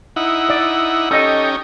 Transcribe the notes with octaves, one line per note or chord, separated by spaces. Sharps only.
D#4 E4 F#5
D5
C#4 D#4 G4 A4 D#5